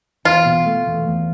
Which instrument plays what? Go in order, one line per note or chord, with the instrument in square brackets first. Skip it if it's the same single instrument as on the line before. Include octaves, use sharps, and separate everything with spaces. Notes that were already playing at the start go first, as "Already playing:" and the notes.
[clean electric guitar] E2 [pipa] F4
[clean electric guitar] B2
A3
E2
E2